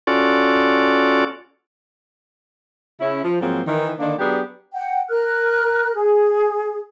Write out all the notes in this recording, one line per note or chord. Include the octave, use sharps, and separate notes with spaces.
C#4 F4 F#4 A4 D5
C#3 C#4 E4
F3
G#2 F3 F#3 A#3 C4
D#3 E3
D3 D#3 A#3 D4
F#3 B3 D4 G4 G#4
F#5 G5
A#4 F6 F#6
G#4